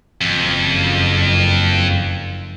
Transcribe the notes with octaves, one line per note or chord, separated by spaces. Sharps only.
F#1 F2